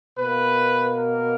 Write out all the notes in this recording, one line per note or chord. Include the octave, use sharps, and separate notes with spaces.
B2 A#3 B4
A#4